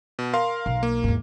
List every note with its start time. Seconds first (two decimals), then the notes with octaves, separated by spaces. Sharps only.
0.19 B2
0.33 A#4 F5 C6
0.66 B1
0.83 A#3
1.04 E2 G#2